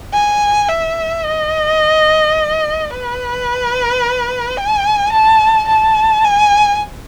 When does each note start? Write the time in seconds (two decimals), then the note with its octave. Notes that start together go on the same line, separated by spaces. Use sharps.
0.14 G#5
0.69 E5
1.24 D#5
2.90 B4
4.57 G#5
5.12 A5
5.68 A5
6.24 G#5